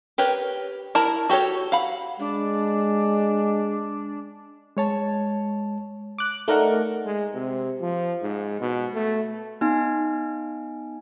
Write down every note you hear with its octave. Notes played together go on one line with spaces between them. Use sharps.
G4 A#4 B4 C#5
E4 A#4 A5 A#5
F#4 G4 A4 C#5
F5 F#5 B5
G#3 D4
G#3 C#5 A5
D6 F#6
A3 D#4 A#4 D5 F#5
G#3
C3
F3
G#2
B2
A3
B3 D#4 G#5